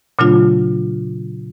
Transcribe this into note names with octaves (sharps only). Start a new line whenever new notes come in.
A#2 C#3 F#3 A3 D4 F4